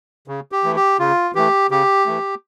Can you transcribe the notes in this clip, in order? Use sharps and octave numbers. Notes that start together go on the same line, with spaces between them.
C#3
G4
E3 A3
G4
C#3 F4
E3 A3 G4
C#3 G4
E3 A3